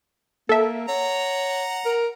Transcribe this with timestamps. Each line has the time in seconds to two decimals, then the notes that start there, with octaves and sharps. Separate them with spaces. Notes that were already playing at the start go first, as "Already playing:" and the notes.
0.49 A#3 A4 E5
0.88 C#5 F#5 A#5
1.86 A#4